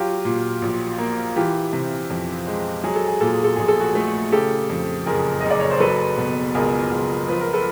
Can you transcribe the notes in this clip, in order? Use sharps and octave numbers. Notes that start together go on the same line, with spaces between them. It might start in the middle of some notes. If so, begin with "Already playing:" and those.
Already playing: F#3 F4 G4
A#2
A#1
A#3
E3 F4 G4
C3
F2
G#3
F#3 G#4
A4
G#4
A#2 A4
G#4
A4
A#1 G#4
A4
F#4 G#4
A3
C#3 G4 A4
F2
F#1 G#4 A#4
F#1 D#5
D5
C#5
C5
F#3 A4 B4
B2
C#2 G#4 A#4
C#2
F3 B4
A#4
A4 B4